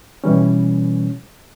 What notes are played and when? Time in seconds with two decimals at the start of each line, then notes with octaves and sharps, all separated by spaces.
0.24 B2 E3 G3 C#4